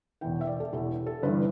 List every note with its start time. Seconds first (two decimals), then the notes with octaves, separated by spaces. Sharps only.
0.21 E1 E2 E3 G5
0.41 E5
0.47 D5
0.60 A4
0.72 E1 E2 E3 G4
1.07 A4
1.23 G1 G2 E3 B4